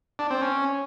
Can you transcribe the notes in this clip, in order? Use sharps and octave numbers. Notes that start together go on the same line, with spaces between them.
D4
C4
C#4